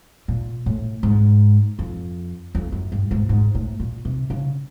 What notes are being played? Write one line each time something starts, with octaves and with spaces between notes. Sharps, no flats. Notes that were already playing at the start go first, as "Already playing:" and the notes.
A#2
A2
G#2
F2
F2
F#2
G2
G#2
G#2
A2
A#2
C3
C#3